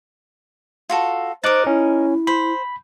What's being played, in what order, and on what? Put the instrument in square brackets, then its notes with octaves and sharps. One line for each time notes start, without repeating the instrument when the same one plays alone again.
[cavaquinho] F4 F#4 A4
[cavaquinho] D#4 A#4 [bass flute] C5 [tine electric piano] D6 F#6 A6
[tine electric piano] C#4 [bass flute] E4
[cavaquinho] C5 [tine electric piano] B5